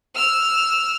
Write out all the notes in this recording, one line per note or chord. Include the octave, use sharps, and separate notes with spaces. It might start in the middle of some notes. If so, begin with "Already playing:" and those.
E6 F6